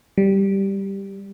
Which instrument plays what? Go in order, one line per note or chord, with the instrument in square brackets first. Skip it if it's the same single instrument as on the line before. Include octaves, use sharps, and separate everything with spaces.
[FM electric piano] G3